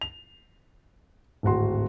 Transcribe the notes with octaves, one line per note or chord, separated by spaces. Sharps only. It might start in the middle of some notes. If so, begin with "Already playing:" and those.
F7
D1 G#1 F#4 C6